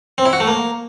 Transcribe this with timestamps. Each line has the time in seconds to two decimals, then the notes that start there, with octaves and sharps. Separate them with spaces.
0.18 C4
0.26 E4
0.33 F#4
0.40 A3
0.48 A#3